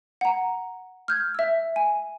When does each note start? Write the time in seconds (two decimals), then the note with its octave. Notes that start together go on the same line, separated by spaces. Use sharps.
0.21 F#5 A#5
1.08 F6 G6 G#6
1.35 E5 E6
1.76 G#5